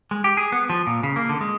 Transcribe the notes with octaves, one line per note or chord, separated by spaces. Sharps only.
G#3
G4
G#4
B3
F3
A#2
C#3
A#3
D3
G#3